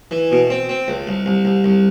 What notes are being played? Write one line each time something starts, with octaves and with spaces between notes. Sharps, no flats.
E3
B2
C4
C4
C#2
C2
C2
C2
C2